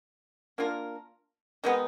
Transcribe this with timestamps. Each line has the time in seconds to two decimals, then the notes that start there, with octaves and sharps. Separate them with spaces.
0.58 A#3 D4 F4 A#4
1.64 D#3 G#3 B3 D#4